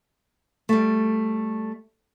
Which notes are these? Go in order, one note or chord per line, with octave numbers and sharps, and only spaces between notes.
G3 A3